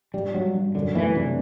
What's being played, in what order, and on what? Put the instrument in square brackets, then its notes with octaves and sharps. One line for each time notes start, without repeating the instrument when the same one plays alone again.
[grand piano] G2 [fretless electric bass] G3
[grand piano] G2 [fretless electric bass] F#3
[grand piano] G2
[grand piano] F#2 [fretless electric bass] D3
[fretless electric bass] E3 [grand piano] A3
[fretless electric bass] C3 [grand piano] D4